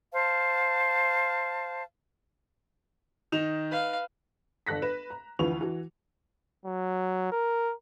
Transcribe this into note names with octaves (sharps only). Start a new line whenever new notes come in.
C5 F5 A5
D#3 D#4 E7 F7
B4 F5
G1 A4 F#6 A#6 B6
B4 E7
A#5
D2 E3 F3 B4 C#6 F7
E3 F#4
F#3
A#4